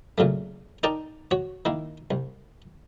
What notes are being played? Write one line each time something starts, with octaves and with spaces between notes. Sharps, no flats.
A#2 C#3 F#3 A3
D#4 A#4 D5 G5 A5 A#5
F#4 C#5
D#3 A#3 E4
C2